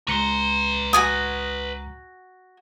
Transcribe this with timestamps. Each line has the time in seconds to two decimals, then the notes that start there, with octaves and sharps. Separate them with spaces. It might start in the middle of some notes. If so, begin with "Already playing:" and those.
0.08 C#2 B4 A#5 C6 C#7
0.93 F#4 G#5 D#6